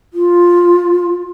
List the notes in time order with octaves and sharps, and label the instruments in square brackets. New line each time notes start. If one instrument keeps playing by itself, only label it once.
[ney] F4